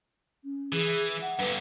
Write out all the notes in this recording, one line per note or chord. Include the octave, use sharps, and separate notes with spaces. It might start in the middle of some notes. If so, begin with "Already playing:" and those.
C#4
E3 G#4
F#5
G2 D3 B4